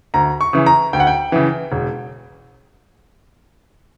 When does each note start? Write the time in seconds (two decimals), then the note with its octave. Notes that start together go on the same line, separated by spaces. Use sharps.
0.14 D2 A#5
0.41 C#6
0.53 C#3 E3
0.66 A#5
0.93 D2 G5
1.00 F#5
1.07 G5
1.32 C#3 E3
1.72 E1